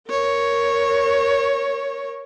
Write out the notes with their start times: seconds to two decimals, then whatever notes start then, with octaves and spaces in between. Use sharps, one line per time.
0.10 A#4 C#5